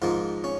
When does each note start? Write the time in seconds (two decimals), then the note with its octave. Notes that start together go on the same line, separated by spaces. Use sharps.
0.02 G#2 F3 A#3 F4
0.44 C#4